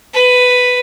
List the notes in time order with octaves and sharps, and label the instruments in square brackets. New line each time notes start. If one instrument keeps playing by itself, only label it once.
[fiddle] B4